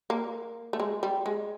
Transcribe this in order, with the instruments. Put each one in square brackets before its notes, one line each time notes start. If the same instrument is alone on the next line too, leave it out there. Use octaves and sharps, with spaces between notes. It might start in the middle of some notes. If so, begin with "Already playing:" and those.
[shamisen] A#3
A3
G#3
G3
G#3